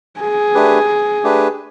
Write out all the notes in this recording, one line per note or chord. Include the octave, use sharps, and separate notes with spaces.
G#4
A3 D4 G4 B4
A3 D4 G4 B4